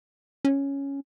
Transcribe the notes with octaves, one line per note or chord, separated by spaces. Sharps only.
C#4